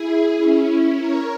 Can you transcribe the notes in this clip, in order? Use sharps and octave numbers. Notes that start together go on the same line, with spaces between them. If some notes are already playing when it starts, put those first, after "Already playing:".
Already playing: E4 G#4
C#4 E4
A#4 C#5